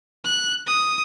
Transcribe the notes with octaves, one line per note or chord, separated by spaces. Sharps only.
F#6
D#6